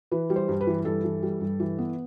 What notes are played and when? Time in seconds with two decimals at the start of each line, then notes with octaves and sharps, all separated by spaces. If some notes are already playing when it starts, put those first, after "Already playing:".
0.11 E3 B4
0.30 G3
0.36 C5
0.48 G2
0.61 B4
0.67 E3
0.85 G2 A4
1.04 E3
1.23 G3
1.41 G2
1.60 E3
1.78 B3